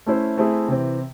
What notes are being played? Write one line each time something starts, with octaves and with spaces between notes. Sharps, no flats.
A3 C#4 E4 C5
A3 C4 E4 G#4
C3 E3 C4